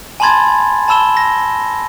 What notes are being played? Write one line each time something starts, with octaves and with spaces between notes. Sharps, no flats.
G#5 A5 B5 C6 G#6 A6
A5 B5 E6 E7 G7
A#6